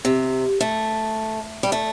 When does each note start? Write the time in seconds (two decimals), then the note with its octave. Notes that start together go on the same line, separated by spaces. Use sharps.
0.05 C3
0.60 A3
1.63 G3
1.72 A3